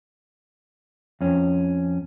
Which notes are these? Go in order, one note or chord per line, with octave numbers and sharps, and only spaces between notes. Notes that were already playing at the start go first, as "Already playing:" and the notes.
F2 C#4